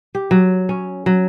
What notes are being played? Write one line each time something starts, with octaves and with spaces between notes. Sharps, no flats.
G4
F#3
C#4
F#3